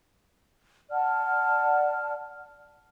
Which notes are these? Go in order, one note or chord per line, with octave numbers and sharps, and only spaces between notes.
D5 F#5 A5 F6